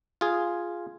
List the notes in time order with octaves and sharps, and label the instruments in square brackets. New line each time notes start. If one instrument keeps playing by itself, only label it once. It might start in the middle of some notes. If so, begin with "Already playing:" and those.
[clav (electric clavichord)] F4 G#4